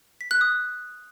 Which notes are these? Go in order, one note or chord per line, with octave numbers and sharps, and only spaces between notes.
B6
F#6
D#6